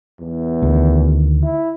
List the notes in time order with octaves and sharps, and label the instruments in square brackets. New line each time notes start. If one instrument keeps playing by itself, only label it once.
[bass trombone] E2
[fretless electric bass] D2 D#3
[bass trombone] E4